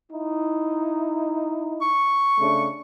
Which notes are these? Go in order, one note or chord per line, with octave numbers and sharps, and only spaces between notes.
D#4 E4
C#6
C#3 A3 D4